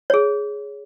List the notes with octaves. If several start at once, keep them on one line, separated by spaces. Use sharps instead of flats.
G#4 C#5